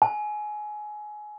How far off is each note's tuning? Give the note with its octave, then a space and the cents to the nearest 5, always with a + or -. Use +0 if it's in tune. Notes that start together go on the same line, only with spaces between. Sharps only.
G#5 +20